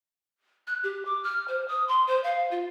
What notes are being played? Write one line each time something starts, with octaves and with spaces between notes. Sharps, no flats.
F#6
G4
D6
F6
C5
D#6
C6
C5
F5
F4